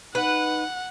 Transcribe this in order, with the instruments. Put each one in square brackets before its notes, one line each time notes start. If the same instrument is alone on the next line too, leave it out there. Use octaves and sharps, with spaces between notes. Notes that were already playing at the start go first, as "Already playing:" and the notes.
[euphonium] D#4 [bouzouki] B4 [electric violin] F#5